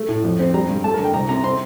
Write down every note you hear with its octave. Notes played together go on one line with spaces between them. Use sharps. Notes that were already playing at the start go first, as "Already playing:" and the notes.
Already playing: A3
A2
F2
C4
G3 A#5
G2
A3 A5
A#4
D3 G5
C2 A#5
C3 A#5
C4 C6